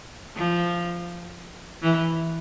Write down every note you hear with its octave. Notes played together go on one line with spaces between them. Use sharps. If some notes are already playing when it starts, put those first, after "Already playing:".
F3
E3